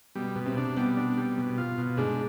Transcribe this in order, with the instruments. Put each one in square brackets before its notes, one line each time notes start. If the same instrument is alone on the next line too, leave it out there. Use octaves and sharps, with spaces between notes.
[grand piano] B2 B3 [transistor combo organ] G3
[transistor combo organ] B2
[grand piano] C3 C4
[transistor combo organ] D4
[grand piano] B2 B3 [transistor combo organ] G3
[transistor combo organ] D4
G3
B2
F4
B2
[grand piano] G#2 G#3 [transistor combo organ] D4